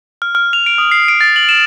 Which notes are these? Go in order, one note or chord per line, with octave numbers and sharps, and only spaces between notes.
F6
F6
F7
D7
D#6
C7
D7
A6
F#7
E7